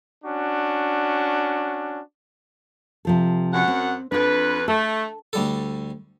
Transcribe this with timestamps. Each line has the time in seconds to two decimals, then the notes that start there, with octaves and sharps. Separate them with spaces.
0.24 C#4 D4 F#4
3.05 C3 F3 A4
3.53 F#2 F#5
3.68 C4
4.12 F2 D4 B4 D5
4.68 A3 A4
5.33 D2 G3 A4